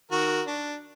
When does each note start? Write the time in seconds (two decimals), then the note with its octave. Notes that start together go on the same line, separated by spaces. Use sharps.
0.12 D#3 F#4 A#4
0.47 D4